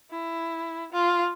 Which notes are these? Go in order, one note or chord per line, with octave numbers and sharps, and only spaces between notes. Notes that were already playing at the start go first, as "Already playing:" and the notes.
E4
F4